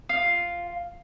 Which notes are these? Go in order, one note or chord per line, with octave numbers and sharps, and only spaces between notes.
F4